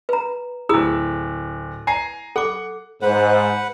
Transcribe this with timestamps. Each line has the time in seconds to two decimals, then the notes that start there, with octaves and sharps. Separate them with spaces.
0.09 B4 A#5
0.69 D1 E4 G#4 D#6 E6
1.87 G#5 A#5 C7
2.36 A4 F#5 D6
3.02 G#2 B4 C5 F#5